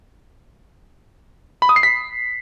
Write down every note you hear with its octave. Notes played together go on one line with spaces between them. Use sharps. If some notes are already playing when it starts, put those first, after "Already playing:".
B5
D#6
C7
B6